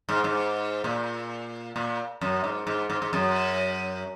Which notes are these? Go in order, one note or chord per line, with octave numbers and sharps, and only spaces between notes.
G#2
G#2
A#2
A#2
F#2
G#2
G#2
G#2
G#2
F#2